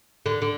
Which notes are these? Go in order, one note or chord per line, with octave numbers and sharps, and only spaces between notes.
D3
D3